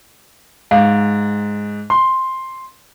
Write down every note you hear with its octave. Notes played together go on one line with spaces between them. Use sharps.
G#2 F5
C6